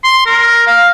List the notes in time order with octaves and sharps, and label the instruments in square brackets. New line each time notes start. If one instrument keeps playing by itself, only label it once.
[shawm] C6
A#4
F5